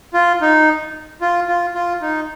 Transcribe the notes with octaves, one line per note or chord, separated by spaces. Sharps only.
F4
D#4
F4
F4
F4
D#4